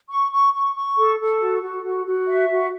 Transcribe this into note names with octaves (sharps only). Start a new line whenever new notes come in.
C#6
C#6
C#6
C#6
A4
A4
F#4
F#4
F#4
F#4
E5
F#4